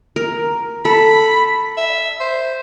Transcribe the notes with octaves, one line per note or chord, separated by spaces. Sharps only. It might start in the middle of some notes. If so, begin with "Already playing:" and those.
A#4
A4 B5
E5
C5